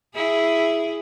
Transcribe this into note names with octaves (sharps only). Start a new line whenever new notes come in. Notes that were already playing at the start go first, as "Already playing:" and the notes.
E4 G#4